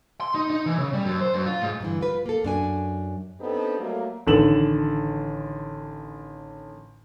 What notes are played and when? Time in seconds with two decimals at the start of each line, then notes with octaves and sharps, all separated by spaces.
0.21 C6
0.35 D#4
0.50 D#4
0.66 E3
0.79 C#3
0.93 G3
1.05 F#2
1.21 C5
1.34 F#2
1.46 F4
1.62 G#2
1.81 G2 D3 E3
2.01 F4 B4
2.26 A#3 A4
2.44 F#2 D4 G#5
3.39 B3 C4 D4 D#4 G4 A4
3.79 F#3 G3 A3 A#3
4.27 A1 D3 D#3 A4 E7 F#7